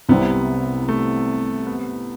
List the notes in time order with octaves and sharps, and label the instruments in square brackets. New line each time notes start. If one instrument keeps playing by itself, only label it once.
[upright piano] C2 C3 G3 C4 [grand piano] B3
[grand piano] A3
B3